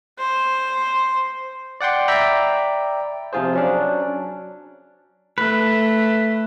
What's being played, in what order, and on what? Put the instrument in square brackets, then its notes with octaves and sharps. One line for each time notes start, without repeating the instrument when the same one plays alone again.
[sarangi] C5
[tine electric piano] D5 F#5 G5 C6
D5 E5 G5 A#5 B5
C3 F3 F4 G#4 C5
F#3 C#4 D4
[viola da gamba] A3 [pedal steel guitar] B4